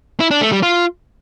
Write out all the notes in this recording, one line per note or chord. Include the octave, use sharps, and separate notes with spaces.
E4
D4
A3
G3
F4